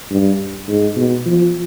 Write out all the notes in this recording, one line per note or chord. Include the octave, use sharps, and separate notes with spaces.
G2
G#2
B2
F3